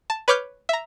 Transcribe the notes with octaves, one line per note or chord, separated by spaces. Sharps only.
A5
B4 C#5 D6 F6 G6
E5 A#5